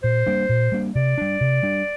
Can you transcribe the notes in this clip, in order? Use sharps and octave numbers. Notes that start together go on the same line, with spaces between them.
A#2 C5
G3 A#3 D4
A#2
G3 A#3 D4
C3 D5
G3 D4
C3
G3 D4